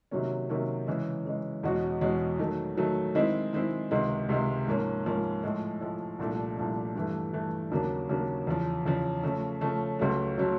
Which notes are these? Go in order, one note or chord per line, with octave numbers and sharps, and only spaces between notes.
C3 D#3 F#3 A#3 C#4
C3 D#3 F#3 A#3 C#4
C#3 E3 G#3
C#3 E3 G#3
E2 B2 G#3 C#4 F#4
E2 B2 G#3 C#4 F#4
D#3 F#3 A3
D#3 F#3 A3
D#3 G#3 C4 E4
D#3 G#3 C4 E4
C#2 C3 D#3 G#3
C#2 C3 D#3 G#3
G#2 F3 A#3 C#4
G#2 F3 A#3 C#4
A2 F3 G#3
A2 F3 G#3
C2 A#2 F3 A3 D4
C2 A#2 F3 A3 D4
G2 E3 A3
G2 E3 A3
D#2 C#3 F#3 A#3 D4
D#2 C#3 F#3 A#3 D4
E2 C#3 F3
E2 C#3 F3
C#3 F3 A3 C#4
C#3 F3 A3 C#4
C#2 C#3 F#3 A3
C#3 F#3 A3